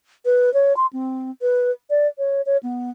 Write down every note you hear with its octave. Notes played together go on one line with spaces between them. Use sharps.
B4
C#5
C6
C4
B4
D5
C#5
C#5
B3